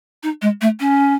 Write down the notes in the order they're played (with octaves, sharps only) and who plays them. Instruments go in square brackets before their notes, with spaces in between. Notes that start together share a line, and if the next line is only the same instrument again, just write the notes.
[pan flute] D#4
G#3
A3
C#4